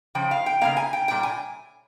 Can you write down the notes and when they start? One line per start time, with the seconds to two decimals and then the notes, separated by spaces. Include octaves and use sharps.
0.15 C#3 F3 G5
0.31 F5
0.46 G5
0.61 C#3 F3 A#3 F5
0.77 G#5
0.93 G5
1.08 A#2 G3 G5
1.23 G#5